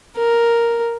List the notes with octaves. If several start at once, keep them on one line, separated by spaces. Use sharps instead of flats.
A#4